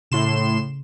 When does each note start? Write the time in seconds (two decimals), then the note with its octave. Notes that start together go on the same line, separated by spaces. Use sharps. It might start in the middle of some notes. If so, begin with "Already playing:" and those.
0.12 A2 C#3 C6 E7